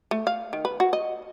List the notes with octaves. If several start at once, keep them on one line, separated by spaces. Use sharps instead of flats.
A3
F5
D#3
B4
F#4
D#5